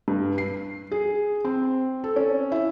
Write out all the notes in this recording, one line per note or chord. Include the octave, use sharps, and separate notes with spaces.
G2
C7
G#4
C4
A4
C#4
E4